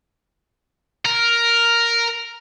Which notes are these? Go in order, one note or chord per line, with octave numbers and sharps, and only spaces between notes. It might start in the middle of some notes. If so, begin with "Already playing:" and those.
A#4